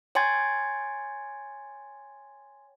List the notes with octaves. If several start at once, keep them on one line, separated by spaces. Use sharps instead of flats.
C#5 G5 G#5 C6 G#6 A6